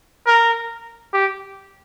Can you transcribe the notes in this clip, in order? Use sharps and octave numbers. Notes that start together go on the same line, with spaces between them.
A#4
G4